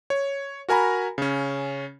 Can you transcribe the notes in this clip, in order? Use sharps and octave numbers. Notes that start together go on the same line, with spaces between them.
C#5
F#4 A#4 G#5 A#5 B5
C#3 C#4